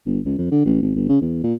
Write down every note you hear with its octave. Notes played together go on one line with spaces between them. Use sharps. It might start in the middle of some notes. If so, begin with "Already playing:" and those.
G1
C#2
F2
D3
A1
G#1
G1
C#3
E2
A#2